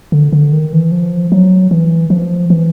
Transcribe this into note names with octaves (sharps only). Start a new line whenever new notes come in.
D3
D3
D#3
E3
F3
F#3
E3
F3
E3